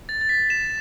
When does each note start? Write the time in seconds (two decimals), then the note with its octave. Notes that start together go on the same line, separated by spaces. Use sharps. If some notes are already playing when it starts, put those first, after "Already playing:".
0.09 A6
0.21 A6
0.29 B6
0.50 E7